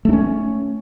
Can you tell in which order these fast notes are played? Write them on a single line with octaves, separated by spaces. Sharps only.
A3 D4 C#4